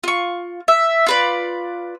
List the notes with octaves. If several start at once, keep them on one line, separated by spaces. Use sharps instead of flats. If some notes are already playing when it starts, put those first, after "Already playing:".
F4 C#6
E5
F4 B4 D5